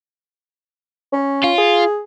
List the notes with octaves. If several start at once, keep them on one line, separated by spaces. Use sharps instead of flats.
C#4
F4
G#4